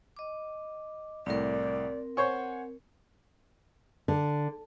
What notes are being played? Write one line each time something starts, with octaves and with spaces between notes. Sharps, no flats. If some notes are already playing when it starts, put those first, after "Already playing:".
D#5 D6
C2 A2 C4 A#4 D5
C5 C#5 F#5 G#5 C#6
D3